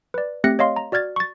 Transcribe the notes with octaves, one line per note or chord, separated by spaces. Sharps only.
B4 D5
A3 C4 G4 F#6 A#6 C#7
C#5 D#5 F5 C6
A#5
F#4 D5 F6 G#6 A6
C#6 A6